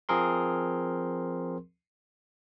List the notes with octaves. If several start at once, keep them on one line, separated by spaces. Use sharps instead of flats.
F3 C4 G#4 A#4 C6